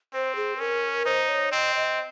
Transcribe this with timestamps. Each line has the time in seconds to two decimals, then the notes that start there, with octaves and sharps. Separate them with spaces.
0.14 C4 C5
0.36 G#4
0.56 C5
0.60 C#4 A#4
1.06 D#4 C5
1.29 C#5
1.52 C4 D#5
1.75 D#5